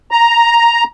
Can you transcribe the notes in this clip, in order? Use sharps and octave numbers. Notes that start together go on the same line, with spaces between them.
A#5